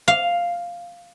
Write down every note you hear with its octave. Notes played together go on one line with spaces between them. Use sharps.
F5